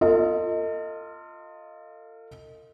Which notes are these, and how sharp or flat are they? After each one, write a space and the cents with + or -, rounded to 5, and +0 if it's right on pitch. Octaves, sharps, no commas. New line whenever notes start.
F4 +0 A4 +45 D#5 +10